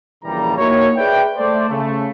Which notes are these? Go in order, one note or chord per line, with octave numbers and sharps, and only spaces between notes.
A#1 A#2 C#3 E3 G3 A#5
A#3 D#4 E4 F#4 C#5
G#4 B4 D5 E5 G5
A3 C5 D5
C#3 A3